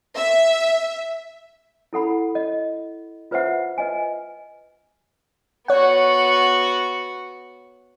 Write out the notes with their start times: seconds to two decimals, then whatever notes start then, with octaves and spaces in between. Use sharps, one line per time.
0.16 E5
1.93 E4 A4 F#5 B5
2.35 D#5
3.31 F4 B4 C5 E5 F#5
3.78 B4 D#5 G#5
5.68 B3 F#4 C#5 F#5